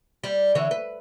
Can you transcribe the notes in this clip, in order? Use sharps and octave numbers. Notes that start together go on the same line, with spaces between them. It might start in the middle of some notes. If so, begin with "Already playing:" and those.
G3
D3 E3 C#5
B4